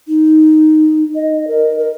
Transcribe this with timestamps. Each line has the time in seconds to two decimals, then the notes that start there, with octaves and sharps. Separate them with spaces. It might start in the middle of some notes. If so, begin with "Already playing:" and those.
0.08 D#4
1.15 D#5
1.48 A#4
1.79 A#4